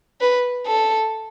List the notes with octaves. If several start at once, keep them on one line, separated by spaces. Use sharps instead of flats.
B4
A4